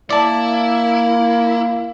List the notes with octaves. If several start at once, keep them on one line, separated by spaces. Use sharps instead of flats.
A#3 E4 D5 A5